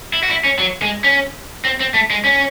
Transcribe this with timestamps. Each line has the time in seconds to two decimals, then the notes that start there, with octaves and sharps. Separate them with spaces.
0.13 E4
0.23 F#4
0.30 E4
0.44 C#4
0.59 F#3
0.82 G#3
1.04 C#4
1.65 C4
1.80 C4
1.94 A3
2.10 G#3
2.25 C#4